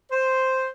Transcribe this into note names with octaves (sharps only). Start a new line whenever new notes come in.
C5